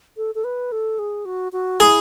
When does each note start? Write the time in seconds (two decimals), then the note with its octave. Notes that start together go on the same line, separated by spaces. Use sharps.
0.17 A4
0.35 A4
0.44 B4
0.72 A4
0.99 G#4
1.25 F#4
1.52 F#4
1.80 E4 G#4